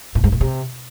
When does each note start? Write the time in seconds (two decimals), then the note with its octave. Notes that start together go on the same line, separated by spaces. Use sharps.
0.15 A2
0.24 G#2
0.32 A2
0.41 C3